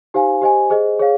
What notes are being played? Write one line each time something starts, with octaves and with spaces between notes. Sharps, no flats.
D#4 G4 C5 F5 G#5
G4 C5 D#5 G#5
G#4 C5 D#5
G#4 C#5 F5